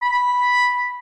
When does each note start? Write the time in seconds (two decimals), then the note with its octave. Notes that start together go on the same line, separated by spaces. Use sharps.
0.02 B5